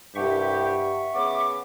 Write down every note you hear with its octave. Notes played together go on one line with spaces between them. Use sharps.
C2 G2 C3 G4 E5 F#5 C#6
C#3 B3 D6